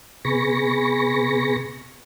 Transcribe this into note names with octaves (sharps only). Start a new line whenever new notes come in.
C3 B3 G#4 B5 C#6 A#6